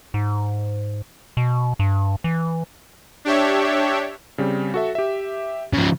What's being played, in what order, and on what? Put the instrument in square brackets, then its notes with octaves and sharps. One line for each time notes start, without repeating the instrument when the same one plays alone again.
[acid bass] G#2
B2
G2
E3
[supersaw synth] D4 G4 C#5 E5
[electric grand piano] C#3 G3 C4
F#4 A4 E5
G4 E5
[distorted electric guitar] C#3 F3